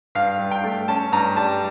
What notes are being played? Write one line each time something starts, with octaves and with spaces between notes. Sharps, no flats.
G2 F5
G2
G5
A3
C#4 A5
G2 A#5
G3 A5